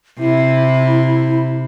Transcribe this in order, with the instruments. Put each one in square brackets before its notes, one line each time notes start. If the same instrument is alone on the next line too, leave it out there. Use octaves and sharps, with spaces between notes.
[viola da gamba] C3 [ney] E4